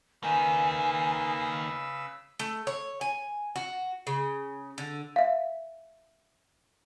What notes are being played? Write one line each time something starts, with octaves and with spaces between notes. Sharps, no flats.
C#3 A#3 D#4 B4 G#5 E6
A3
C#5
G#5
F#4
C#3
D3
E5 F5